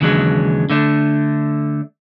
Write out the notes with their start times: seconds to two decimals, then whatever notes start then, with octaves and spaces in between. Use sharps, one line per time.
0.01 D#2 C#3 E3 F#3 G#3 D4
0.70 D3 A3 D4